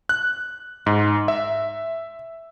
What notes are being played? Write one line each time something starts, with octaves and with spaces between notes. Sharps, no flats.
F#6
G#2
E5